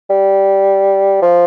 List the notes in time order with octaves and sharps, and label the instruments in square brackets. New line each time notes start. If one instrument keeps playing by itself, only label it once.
[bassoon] G3
F3